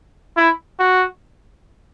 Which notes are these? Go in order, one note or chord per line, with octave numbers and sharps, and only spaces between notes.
E4
F#4